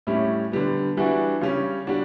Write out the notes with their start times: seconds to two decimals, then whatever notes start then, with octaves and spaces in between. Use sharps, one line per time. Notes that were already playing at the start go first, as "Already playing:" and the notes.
0.07 A2 G3 C#4 E4
0.52 D3 G3 B3
0.97 E3 G3 D4 F#4
1.41 C#3 G3 C#4
1.87 G3 D4 F#4